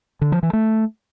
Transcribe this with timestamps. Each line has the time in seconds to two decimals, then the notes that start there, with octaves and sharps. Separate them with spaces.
0.21 D3
0.32 F3
0.43 E3
0.53 A3